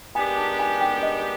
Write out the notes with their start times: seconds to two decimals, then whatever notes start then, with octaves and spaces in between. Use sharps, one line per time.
0.15 G#3 B3 D4 G4 A#4 G#5
0.37 A5
0.59 G#5
0.81 G5
1.03 D#5